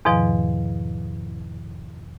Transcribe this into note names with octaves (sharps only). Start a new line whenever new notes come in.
E2 G#2 B2 D#3 F3